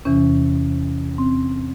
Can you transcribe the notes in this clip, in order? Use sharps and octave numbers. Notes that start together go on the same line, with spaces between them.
E2 C3 E3 C#4
C4